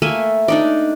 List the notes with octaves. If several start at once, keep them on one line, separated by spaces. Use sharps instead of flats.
A3 A#3 E5 G#5
D4 D#4 D5